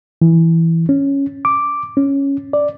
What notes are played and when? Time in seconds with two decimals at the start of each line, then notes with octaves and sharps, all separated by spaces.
0.22 E3
0.89 C#4
1.45 D6
1.97 C#4
2.53 D5